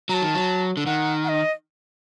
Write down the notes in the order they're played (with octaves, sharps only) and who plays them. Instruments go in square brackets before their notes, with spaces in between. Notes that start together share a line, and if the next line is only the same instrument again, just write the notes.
[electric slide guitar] F#3 [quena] A5 A#5
[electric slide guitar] D#3
F#3
D3
[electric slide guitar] D#3 [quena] F#5
[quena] F#5
D#5